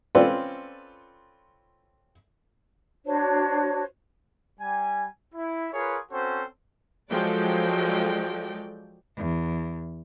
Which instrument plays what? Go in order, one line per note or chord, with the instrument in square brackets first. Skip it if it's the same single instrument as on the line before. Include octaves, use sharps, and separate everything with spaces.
[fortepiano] C4 C#4 F4 A4 B4 D5
[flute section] D4 F#4 C5 C#5
[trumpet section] G3 G#5
E4
F4 G#4 A#4 B4 C#5
C4 C#4 F#4 A4 C5
[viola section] F3 F#3 G#3 A4 D5 G5
[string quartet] E2